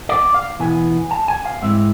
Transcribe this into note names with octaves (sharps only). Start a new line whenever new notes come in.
D5
F5
E2 B2 B3 E4 G#5
A5
G#5
F5
G#2 G#3 C4 E4 E5